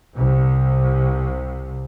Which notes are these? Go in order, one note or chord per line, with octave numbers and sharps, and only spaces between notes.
C2 C3